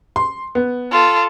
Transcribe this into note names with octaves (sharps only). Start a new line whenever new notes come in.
C6
B3
F4 A4